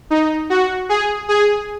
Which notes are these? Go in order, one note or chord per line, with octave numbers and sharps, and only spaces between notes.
D#4
F#4
G#4
G#4